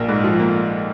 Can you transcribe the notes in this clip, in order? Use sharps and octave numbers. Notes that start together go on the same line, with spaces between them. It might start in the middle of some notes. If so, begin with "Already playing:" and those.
Already playing: A#1 A#3
G#2
F3
A#3